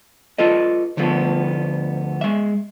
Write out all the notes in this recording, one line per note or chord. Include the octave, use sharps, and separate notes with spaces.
F4 A4 B4 D#5
D2 D3 F3 A3 B3
G#3 E5